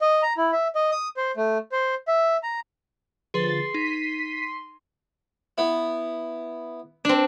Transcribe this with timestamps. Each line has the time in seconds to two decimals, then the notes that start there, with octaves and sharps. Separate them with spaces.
0.01 D#5
0.22 A#5
0.37 E4
0.53 E5
0.75 D#5
0.91 D#6
1.17 C5
1.37 A3
1.72 C5
2.08 E5
2.43 A#5
3.34 D3 F3 G#4 B4 C6 A6
3.74 D#4 B6 D#7
5.58 B3 E4
7.05 C4 D4